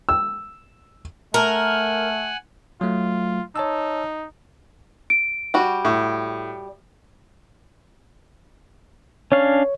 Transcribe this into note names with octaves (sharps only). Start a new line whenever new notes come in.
E6
A3 A#4 F#5 G#5
F#3 A3 F4
D#4 C#5 A5 E6
D7
G3 F#4
A2
C#4 D4 C#5 F5